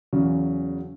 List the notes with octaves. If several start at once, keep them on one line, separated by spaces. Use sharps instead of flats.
E2 C#3 F#3